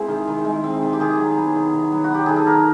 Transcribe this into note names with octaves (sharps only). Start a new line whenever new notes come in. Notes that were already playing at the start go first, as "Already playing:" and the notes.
Already playing: G#3 C4 E4
D#3
D#3
G#3
C4
D#3
G4
D#3 G#4
F#3
B3
D#3
D#3
F#3
F#4
B3 G4
D#3 G#4
A4
D#3 A#4